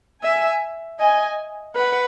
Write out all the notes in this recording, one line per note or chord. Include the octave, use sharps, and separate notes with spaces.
E5 G#5
D#5 G#5
B4 F#5